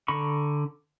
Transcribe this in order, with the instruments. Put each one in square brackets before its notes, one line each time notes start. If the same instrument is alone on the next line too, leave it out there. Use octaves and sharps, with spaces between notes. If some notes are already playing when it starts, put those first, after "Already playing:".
[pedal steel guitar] D3 A#5 B5 C#6